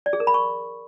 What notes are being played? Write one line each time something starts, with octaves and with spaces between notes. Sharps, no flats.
D5
G#4
A#4
B5
C#6